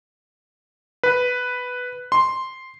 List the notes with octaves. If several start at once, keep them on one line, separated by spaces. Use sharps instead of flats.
B4
C6